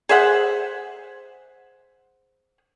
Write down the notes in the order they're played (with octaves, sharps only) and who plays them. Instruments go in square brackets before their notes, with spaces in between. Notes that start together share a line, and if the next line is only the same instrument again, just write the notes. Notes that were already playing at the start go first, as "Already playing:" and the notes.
[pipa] G#4 C5 E5 F#5